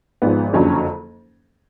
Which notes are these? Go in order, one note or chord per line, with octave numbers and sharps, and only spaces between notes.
G#1 G#2 F3 B3
F#1 F2 D3 F#3 C#4